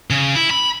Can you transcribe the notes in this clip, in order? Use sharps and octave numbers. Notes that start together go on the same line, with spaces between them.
C#3
E4
B5